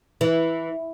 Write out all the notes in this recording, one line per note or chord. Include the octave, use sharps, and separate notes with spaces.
E3